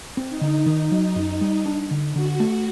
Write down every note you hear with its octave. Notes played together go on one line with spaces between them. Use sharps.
C4
D#4
D3
D#3
F#3
F#2
G3
D4
D3
D3 F#4
A3